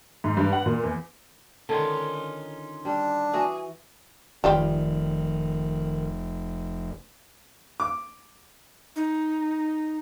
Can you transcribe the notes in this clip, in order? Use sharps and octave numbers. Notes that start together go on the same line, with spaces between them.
G#2
G2
F#5
A#2
E2
D3 D#3 C#4 D#4 F4
G3 D4
E3 F#4 G#4 G#5
F1 D#3 G3 F4 G4
D6
D#4